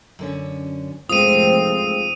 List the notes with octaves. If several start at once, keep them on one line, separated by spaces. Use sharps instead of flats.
F#2 D3 C#4
F1 G#3 A3 C4 F4 D#6 D#7